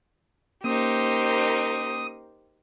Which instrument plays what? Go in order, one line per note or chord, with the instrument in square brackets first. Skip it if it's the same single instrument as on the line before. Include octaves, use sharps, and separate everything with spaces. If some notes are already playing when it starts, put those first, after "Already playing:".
[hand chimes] A#3 C#4 [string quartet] D#4 A#4 [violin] G4 C5 [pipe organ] D#6